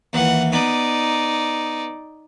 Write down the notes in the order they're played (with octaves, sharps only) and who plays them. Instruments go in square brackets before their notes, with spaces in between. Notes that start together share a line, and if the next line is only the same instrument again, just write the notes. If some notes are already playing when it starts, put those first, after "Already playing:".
[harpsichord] D#2 E3 [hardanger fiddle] F#5
[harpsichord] B3 [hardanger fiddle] D#4 D5